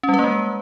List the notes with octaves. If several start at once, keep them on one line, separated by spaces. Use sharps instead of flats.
C#4
G3
B4
A#3
G#3